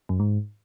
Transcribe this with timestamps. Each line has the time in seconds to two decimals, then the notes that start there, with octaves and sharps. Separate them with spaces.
0.09 F#2
0.20 G#2